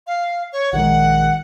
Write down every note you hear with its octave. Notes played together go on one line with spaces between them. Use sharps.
F5
C#5
A#1 D#3 G#3 F#5